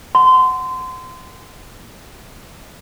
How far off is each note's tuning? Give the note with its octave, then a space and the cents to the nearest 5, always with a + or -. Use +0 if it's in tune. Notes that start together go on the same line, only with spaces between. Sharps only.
F#5 -5 C6 -25